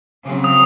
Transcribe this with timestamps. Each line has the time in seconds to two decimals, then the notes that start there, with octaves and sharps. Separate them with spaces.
0.24 C#3 F#3 C4
0.44 D#6